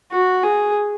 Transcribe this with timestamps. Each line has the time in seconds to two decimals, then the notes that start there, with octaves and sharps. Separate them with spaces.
0.12 F#4
0.44 G#4